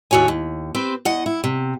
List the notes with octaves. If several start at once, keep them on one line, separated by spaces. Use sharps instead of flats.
D#2 A2 F#4 C#5 G#5
D#2
C4 G4 B4 C5
E2 D#5 F#5
E4
C3